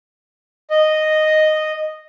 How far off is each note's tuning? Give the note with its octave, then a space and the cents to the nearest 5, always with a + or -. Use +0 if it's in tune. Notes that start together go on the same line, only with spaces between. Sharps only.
D#5 -5